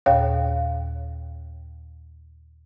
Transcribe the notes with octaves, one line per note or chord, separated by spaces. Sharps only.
D#2 A#2 C#5 F5 G5